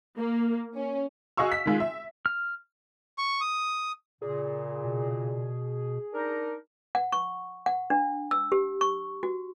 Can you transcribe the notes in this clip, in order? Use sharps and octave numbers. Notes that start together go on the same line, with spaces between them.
A#3
C#4
F#4 G#4 D#5 F5 C#6 E6
B6
D#3 G#3 F4
E5
F6
C#6
D#6
A#2 C#3 G#4
B2
D4 D#4 A#4
F#5
C#6
F#5
D4
E6
G4
C#6
F#4